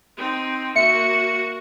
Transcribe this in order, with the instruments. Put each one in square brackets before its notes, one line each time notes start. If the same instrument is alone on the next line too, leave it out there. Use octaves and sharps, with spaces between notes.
[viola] C4 D#4
[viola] A#3 F#4 [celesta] E5 [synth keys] C#7